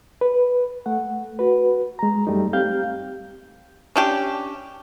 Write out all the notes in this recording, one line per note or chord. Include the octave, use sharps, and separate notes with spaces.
B4
A3 F#5
F#4 B4
G#3 A#5
F#2 G3 A3 D#4
C4 G4 F5 G6
C#4 D4 G4